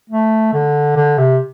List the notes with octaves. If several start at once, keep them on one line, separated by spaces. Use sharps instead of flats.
A3
D3
D3
C3